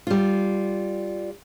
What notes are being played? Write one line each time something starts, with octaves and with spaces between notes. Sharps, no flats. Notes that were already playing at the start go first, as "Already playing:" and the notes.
G3 F4